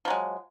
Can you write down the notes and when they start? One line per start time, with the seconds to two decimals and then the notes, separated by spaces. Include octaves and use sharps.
0.05 F3
0.08 F#3
0.10 G#3